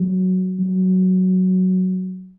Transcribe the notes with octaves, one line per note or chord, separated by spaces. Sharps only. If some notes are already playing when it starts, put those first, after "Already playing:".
Already playing: F#3
F#3